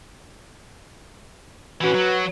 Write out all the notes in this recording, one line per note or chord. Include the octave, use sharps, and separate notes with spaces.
E3 C#4 F#4 B4
F#3